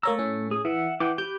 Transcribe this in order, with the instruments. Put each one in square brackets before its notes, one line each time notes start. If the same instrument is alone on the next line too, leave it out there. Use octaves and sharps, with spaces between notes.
[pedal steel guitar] A3 E6 [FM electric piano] A#3 C#5 A#5
[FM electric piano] A2 C#4
[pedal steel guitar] G#4
[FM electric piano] E3 [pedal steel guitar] E5 F#5
[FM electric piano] E3 [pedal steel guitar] F#5 G5 D6
[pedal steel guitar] G4 B4 [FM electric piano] G6